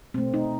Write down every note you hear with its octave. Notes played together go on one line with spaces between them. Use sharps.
B2 A3 C4
D#4